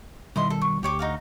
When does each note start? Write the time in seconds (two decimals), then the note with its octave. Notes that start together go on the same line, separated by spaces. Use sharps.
0.36 B2 D#3 G3 E4 D#5 C6
0.50 A4
0.62 C#6
0.83 D2 G4 C#5 D6
0.99 D#4 F#4 F5